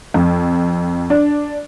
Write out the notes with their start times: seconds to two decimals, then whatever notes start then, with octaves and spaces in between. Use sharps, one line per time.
0.14 F2
1.10 D4